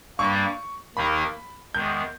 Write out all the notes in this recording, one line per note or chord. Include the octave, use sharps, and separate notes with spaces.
G2 G3 A#3 C#6
D#2 D#3 A#3 D#4 A#4 B5
E2 D#3 G#3 G6